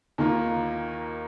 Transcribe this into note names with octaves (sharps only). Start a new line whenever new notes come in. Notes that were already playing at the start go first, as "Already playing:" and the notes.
D#2 D#3 A#3 F4